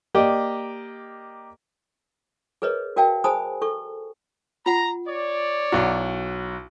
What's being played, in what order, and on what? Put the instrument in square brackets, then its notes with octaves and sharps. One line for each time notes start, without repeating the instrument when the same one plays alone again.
[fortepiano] A#3 G4 D5 D#5
[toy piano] G#4 A#4 B4 C#5 D#5
F#4 A#4 D5 F5 G5 A5
G#4 C5 G#5 A5 B5 D#6
A4 C#6
[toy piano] F4 F#5 [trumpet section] A#5
[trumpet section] C#5 D5
[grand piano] B1 F#4 [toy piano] E4 F#5